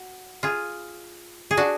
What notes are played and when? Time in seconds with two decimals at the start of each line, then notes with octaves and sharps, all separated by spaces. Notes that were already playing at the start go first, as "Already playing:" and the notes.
Already playing: F#4
0.43 F4 G#4
1.51 G#4
1.57 D4 F#4